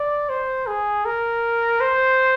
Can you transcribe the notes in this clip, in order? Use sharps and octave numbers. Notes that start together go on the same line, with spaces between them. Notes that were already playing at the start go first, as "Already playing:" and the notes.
Already playing: D5
C5
G#4
A#4
C5